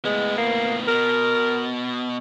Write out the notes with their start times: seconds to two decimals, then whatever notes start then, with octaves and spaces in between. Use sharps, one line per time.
0.05 A2 G#3 B3
0.38 A#3
0.88 B2 A#4